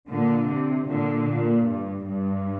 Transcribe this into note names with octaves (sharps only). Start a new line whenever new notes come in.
A#2 D3
C3
A#2 D3
A#2
G2
G2